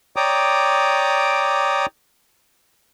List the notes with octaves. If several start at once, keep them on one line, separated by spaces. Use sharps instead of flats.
C#5 D5 G5 A#5 D6 D#6